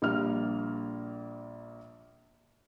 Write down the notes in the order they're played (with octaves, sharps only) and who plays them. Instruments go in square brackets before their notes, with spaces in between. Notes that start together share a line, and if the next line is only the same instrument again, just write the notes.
[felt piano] A#1 G3 A#3 F6